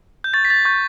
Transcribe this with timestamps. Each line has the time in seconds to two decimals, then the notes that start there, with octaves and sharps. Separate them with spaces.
0.24 G6
0.34 C#6 A6
0.45 B6
0.50 C#6 A6
0.65 C#6 G6